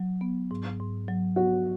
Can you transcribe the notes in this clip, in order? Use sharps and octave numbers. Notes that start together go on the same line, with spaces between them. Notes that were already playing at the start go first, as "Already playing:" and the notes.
Already playing: F#3
B3
G#2
G#2
F#3
B3 F#4